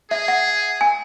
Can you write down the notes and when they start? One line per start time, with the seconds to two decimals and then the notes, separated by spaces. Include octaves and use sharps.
0.10 G#4 E5
0.28 F#5
0.81 G#5